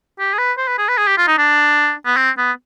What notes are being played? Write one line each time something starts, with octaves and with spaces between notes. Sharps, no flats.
G4
G#4
B4
C5
B4
G#4
B4
G#4
G4
F4
D#4
D4
B3
C4
B3